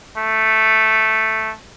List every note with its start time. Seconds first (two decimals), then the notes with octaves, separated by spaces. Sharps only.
0.18 A3